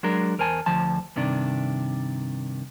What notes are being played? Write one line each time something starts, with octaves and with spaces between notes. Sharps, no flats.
F#3 G#3 D4 A#4
E2 A#4 C5 G#5 A5
D2 F3 A5
G2 C3 D#3 D4